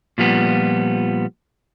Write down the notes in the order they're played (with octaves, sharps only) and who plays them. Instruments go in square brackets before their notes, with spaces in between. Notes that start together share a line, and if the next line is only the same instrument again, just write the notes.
[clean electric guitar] A#2 F3 G3 B3